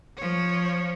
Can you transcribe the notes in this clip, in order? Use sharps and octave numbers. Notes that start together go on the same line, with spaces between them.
F3 C#5